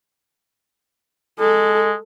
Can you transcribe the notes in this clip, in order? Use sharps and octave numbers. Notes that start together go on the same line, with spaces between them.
G#3 A4